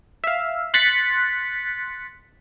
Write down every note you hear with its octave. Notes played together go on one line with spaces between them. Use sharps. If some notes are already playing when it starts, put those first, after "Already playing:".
E5 F5
C6 F#6 A6 B6 C#7